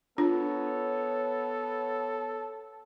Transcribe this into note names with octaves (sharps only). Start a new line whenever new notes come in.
B3 D4 F4 A4 C#5